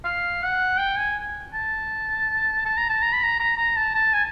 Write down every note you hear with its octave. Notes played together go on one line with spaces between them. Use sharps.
F5
F#5
G5
G#5
A5
A5
A#5
A5
A#5
B5
A#5
A#5
A#5
A5
A5
G#5